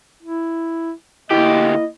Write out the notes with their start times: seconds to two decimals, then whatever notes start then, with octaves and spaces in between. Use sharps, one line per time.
0.23 E4
1.31 D2 A#3 E4 G4 D#5